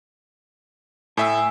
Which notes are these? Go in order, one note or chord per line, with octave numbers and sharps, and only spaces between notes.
A2 E5 G#5 E6